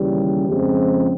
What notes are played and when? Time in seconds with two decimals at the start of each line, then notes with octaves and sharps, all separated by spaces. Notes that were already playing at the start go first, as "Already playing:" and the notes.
Already playing: D#2 C#3 E3 G3
0.46 F2 C#3 F3 G#3 C4